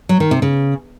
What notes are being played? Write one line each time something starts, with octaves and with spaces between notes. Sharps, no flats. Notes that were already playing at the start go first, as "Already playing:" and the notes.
F#3
D#3
C3
C#3